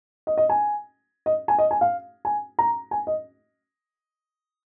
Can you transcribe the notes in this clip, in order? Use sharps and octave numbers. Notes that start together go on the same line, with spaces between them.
D#5
D#5
G#5
D#5
G#5
D#5
G#5
F5
G#5
A#5
G#5
D#5